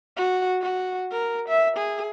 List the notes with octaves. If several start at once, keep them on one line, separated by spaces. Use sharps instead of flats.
F#4
F#4
A#4
E5
G#4